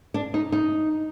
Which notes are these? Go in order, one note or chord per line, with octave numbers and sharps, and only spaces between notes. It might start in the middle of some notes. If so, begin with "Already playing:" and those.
D4
D#4
D#4